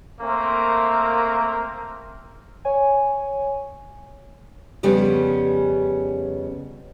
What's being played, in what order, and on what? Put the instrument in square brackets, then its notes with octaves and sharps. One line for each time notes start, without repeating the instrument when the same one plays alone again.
[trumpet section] A3 A#3 C4 A#4
[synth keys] C#5 G#5
[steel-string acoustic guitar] F2 C#3 G3 B3 C#4